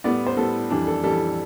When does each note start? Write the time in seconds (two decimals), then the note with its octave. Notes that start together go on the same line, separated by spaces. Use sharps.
0.04 A2 G3 B3 D5
0.27 C5
0.37 A2 G3 B3 A4
0.70 F2 E3 G3 D4
0.87 A4
1.03 F2 E3 G3 A4